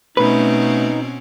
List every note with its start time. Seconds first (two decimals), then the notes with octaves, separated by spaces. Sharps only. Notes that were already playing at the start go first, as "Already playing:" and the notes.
0.17 B2 A3 C4 C#4 D#4 B4